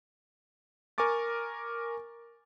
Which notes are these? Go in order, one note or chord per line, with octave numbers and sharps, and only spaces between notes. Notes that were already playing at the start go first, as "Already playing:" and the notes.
A#4 G#5 C#6 D6 A6